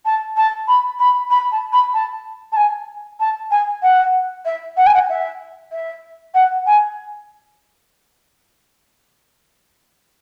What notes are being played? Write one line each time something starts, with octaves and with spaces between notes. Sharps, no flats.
A5
A5
B5
B5
B5
A5
B5
A5
A5
G#5
A5
G#5
F#5
E5
F#5
G#5
F#5
E5
E5
F#5
G#5